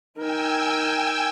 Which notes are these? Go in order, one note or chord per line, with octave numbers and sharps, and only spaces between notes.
D#4 A#4 G5 G#5 E6